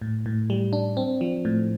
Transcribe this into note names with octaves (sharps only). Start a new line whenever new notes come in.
A2
A2
G3
D4
C4
F3
A2